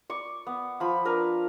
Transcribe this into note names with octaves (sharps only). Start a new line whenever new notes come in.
D5 C#6
B3
F3 B5
D4 A#4 B4